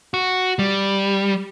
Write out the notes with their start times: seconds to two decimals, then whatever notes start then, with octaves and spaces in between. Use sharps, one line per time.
0.14 F#4
0.59 G3